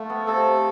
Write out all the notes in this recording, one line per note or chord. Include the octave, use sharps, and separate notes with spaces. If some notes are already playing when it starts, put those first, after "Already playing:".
Already playing: A3 F4
B3
C3 A4